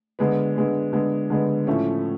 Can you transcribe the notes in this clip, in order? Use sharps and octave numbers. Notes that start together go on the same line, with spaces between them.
D3 G#3 B3
D3 G#3 B3
D3 G#3 B3
D3 G#3 B3
A2 F3 A3 C#4